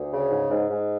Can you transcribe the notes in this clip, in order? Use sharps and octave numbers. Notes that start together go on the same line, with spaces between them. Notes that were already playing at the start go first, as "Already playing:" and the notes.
Already playing: D2
C#3
G#2
G#2
G#2